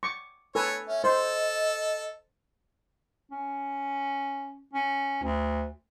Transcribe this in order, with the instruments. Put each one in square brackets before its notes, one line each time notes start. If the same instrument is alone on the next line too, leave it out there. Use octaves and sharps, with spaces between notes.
[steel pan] C#6 D6
[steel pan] A4 B4 G#5 [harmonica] C#5
[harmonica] C#4 [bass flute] E5
[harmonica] A4 [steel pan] C5 [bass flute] D#5
[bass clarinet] C#4
C#4
D2